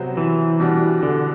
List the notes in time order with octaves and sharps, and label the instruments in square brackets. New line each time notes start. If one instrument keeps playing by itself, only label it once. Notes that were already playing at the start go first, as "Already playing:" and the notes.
Already playing: [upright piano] C3 F#3 B3 F#4 C5
[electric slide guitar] E3
[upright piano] B2 G3 D4 G4
[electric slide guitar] D3